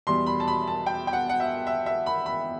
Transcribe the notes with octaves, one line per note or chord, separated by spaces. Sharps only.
E2 B2 G3 C6
B5
A5
B5
A5
G5
G5
F#5
F#5
E5
E5
E5
B5
B5